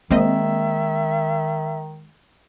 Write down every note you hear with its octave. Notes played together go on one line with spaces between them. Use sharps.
D#3 G#3 A#3 C4 D#5 E5